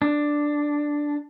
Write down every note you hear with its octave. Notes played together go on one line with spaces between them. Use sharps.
D4